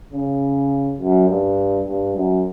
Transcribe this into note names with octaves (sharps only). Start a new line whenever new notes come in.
C#3
F#2
G2
G2
F#2